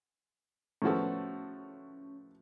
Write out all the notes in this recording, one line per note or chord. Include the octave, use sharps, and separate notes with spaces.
A2 F3 B3 C#4 F#4 A4